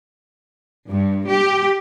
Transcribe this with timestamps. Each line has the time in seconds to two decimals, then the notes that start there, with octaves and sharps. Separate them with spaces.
0.91 G2
1.29 G4